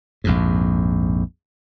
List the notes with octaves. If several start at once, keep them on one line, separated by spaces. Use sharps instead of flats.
A#1 F2 G#2